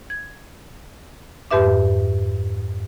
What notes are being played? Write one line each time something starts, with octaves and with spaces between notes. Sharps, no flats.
G#6
F2 G#2 G4 B4 E5 D6